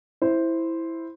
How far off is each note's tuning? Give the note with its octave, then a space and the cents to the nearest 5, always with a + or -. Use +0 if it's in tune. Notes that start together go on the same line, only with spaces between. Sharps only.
E4 +0 C5 +0